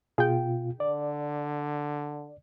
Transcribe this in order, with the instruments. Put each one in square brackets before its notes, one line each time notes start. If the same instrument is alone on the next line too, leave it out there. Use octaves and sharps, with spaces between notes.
[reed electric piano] B2 F4 [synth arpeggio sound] G#4 G5
[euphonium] D3 [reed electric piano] D5